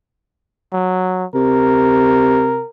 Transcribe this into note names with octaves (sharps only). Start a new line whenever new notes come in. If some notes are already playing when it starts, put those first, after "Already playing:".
F#3
C3 A#4